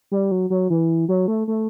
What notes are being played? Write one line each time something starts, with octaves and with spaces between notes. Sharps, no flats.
G3
F#3
F#3
E3
F#3
A3
A3